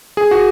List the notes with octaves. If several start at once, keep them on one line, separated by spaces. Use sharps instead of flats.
G#4
F#4